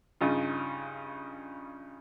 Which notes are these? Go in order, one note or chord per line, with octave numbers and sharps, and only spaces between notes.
G2 C#3 D#4 F4